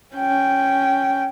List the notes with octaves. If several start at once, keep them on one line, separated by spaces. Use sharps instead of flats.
C#4 G5